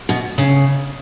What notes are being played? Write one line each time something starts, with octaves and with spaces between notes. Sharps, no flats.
B2
C#3